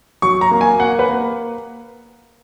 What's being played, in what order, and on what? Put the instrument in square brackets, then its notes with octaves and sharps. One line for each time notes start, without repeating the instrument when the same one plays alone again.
[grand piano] F#3 C#6
A#5
A#3
G#5
A#3 F#5
B4
A#3